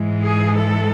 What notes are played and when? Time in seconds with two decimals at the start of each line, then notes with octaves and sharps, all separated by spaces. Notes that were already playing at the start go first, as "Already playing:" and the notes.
Already playing: G#2 E3 G#3
0.24 G#4
0.58 A4